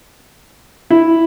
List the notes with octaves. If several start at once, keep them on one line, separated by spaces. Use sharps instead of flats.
E4